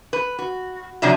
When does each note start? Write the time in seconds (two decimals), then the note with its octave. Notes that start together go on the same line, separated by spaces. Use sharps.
0.13 B4
0.39 F#4
1.02 C3 F3 F#3 D4 E5 A#5